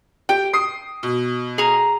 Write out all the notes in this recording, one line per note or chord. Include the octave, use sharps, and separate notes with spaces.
G4 G5
D#6 C7
B2
G#4 A#5